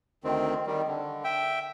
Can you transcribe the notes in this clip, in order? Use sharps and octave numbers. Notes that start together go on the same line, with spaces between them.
D2 D#3 C4
D#3 G3
D3
E5 G5